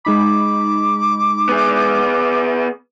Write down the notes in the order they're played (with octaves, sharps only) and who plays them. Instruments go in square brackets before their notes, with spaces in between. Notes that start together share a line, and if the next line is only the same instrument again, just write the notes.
[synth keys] G#3 D#4 B5 [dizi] D6
[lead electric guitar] B3 G#4